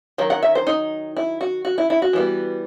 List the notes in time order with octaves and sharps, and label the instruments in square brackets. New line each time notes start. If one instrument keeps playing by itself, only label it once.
[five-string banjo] D#3 F#3
F#5
E5
C5
D#4
E4
F#4
F#4
E4
E4
F#4
E3 G3 B3